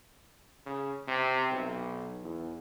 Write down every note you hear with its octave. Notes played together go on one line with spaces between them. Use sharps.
C#3
C3
B1
E2